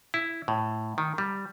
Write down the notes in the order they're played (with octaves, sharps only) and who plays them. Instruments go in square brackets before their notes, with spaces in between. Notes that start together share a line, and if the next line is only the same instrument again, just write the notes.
[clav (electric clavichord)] E4
A2
D#3
G3